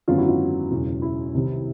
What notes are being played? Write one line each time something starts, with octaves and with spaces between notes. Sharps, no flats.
G#1 F#2 D3 F#3 B3 F4
E4 F#4
F4
E1 E2 C#3 F#3
E4
C2 C3 D#3 G3 C4